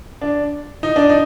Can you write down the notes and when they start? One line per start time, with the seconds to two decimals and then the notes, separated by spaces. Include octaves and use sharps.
0.21 D4
0.83 D#4
0.96 D4
1.09 D#4